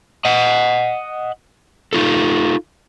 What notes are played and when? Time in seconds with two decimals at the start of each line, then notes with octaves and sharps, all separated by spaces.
0.25 D#5 F#5
1.93 D#4 F4 A4